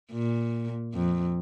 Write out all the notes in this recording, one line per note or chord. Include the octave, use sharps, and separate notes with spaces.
A#2
F2